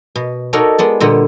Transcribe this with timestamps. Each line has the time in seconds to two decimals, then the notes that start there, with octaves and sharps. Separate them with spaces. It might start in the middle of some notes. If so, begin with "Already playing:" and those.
0.15 B2
0.53 D#4 F#4 A4 A#4 C#5 D5
0.78 G#3 B3 D5
1.00 A#2 D3 G3 B3